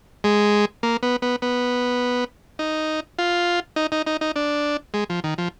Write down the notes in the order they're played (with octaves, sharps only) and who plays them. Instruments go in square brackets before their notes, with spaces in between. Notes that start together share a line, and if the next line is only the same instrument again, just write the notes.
[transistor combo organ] G#3
A#3
B3
B3
B3
D#4
F4
D#4
D#4
D#4
D#4
D4
G#3
F3
D#3
F3